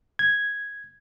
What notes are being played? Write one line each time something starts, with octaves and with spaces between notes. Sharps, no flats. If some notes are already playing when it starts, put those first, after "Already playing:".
G#6